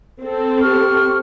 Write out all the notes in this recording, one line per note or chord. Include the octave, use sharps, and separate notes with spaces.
C4 A4
G4 C#6 F6